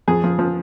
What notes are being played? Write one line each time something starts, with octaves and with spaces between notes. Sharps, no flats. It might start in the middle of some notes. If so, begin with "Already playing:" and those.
F2 G#4
F3
F3